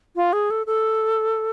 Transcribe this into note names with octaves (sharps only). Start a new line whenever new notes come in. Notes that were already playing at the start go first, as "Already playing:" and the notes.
F4
G#4
A4
A4